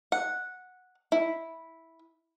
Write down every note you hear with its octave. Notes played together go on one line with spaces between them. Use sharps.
F#5
E4